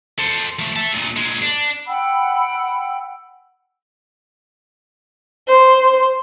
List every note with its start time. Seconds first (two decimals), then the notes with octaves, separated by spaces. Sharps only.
0.19 A4 C5
0.59 F3 A3
0.76 E5 A5
0.93 D2 A#2
1.16 A#2 G#3
1.42 D4
1.87 F#5 G5 B5 E6
5.48 C5